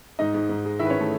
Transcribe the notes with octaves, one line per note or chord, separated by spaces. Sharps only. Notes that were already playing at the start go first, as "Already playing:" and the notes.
G#2 D#4 D#5
G#2
G#2
G#3
D#3 E4 E5
B4
C#4 C#5
A3 A4